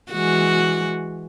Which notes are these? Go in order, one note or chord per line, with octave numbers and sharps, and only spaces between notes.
E3 G#3 F#4